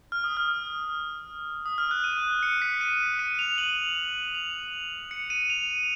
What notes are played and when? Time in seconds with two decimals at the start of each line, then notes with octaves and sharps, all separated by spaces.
0.12 F6
0.24 D#6
0.37 F6
1.66 D#6
1.78 F6
1.91 F#6
2.04 D#7
2.43 C#7
2.62 B6
2.81 D#7
3.19 D#7
3.39 F7
3.58 F#7
4.35 F7
5.11 C#7
5.30 D#7
5.50 F7